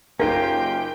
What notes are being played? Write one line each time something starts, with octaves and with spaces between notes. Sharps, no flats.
F#1 C#4 D#4 F4 G4 A#4 G5 A#6